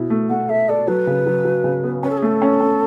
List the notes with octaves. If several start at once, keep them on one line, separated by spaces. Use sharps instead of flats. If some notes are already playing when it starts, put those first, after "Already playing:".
Already playing: B2 E4
A3
A3 F#5
A4 E5
A4 D5
F#3 B4
C#3
F#3
F#3
C#3
B3
C#4 B4
A4
G#4
A3 A4
C#4
C#4